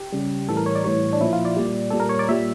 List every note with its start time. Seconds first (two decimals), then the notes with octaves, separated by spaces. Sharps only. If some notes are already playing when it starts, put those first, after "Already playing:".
Already playing: G4
0.12 C#3 G3
0.48 A2 E3 G3 A4
0.57 A#4
0.66 C#5
0.75 D5
0.84 A2 E3 G3 C#5
1.13 D4
1.21 A#2 F3 E4
1.33 F4
1.45 D5
1.56 A#2 G3
1.90 A#2 G3 A4
2.00 A#4
2.09 C#5
2.19 D5
2.29 A#2 G3 E5